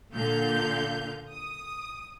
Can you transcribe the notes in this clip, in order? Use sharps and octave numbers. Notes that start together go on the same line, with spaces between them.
A#2 D3 F5 G6
D#6